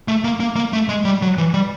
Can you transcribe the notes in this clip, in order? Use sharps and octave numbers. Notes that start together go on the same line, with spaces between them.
A3
A#3
A#3
A#3
A3
G#3
G3
F#3
E3
G3